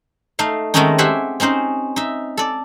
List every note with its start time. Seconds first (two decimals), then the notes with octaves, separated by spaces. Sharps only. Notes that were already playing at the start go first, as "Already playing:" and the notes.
0.39 A3 D#4 F5
0.74 D#3 G#3 A3 C4 C#4 D#4
0.98 G4 C5 E5 F#5 G#5
1.40 C4 C#4 D#4 C5
1.96 D#4 E5
2.37 A4 D5